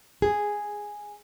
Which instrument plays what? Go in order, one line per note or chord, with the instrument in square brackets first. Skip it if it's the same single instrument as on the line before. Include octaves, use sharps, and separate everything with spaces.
[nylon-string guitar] G#4